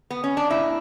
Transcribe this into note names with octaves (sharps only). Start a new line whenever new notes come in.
B3
C#4
D4
A#2 E4